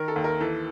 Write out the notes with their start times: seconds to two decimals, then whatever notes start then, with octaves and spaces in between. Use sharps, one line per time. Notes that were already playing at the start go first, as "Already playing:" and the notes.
Already playing: D#3 A#4
0.08 A4
0.16 D#2
0.24 A#4
0.40 E3 A4